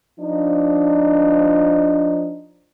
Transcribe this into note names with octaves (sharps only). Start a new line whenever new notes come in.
F3 D4 D#4